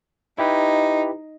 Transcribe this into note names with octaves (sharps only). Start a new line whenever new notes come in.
D#4 E4 G4 B4